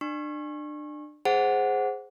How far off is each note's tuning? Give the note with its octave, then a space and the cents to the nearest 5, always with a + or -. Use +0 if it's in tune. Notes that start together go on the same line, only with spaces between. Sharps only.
D4 +30 C#6 -30
G#4 +0 C5 +0 F#5 +0